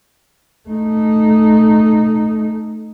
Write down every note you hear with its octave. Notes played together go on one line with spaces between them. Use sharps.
A3 D#4